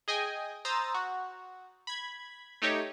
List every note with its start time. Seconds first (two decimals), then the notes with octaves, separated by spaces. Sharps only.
0.08 G#4 D#5 G5 G#5
0.65 C5 A#5 D#6 E6 A6
0.95 F#4
1.87 B5 G#6
2.62 A3 D#4 G4 C#5